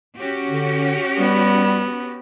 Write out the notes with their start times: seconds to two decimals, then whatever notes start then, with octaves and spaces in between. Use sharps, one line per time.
0.17 C#4 F#4 G4
0.47 D3
1.19 G3 B3